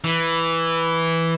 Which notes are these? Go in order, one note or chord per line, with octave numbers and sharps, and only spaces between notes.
E3